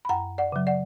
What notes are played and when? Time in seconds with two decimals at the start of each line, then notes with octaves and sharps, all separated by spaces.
0.05 B5
0.09 F#2 F#5 A#5
0.38 D5 F#5
0.52 C#3 F#3
0.67 D5 F#5